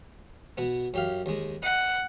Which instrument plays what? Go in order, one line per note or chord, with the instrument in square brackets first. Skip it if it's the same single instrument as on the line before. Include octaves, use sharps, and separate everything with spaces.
[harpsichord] B2 B3
F#2 G4 F5
D#2 G#3
[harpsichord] D#5 [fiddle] F#5